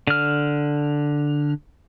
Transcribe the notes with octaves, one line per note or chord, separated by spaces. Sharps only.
D3 F6